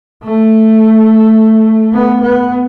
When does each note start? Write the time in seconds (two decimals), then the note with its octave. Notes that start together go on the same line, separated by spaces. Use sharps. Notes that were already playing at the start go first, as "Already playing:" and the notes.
0.24 A3
1.93 B3
2.22 B3